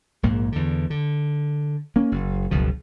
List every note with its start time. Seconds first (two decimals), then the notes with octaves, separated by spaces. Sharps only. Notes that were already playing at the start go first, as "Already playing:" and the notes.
0.23 A#1 G#2 A#3
0.52 E2 D3
0.90 D3
1.96 A#3 C#4
2.12 F#1
2.51 F#1 C#2 B2 F3